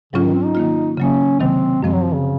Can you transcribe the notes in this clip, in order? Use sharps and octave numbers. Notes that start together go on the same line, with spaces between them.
G#2 C#3 F#3 C#4 F4
D#3
C4
D#4
D#3 A#3 F4
C#3 F#3 A#3 C#4
C3 D#3 F#3 C4
F#2 F3 G#3 C4
F#3
F3
C#3